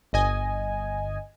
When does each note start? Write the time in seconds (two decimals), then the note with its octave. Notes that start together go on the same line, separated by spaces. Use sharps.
0.13 G1 D#5 G#5